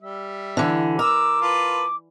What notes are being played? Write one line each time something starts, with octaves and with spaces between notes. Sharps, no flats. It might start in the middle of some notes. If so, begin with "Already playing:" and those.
G3 E5
D3 E3
A#4 D6 E6
F4 B4 A5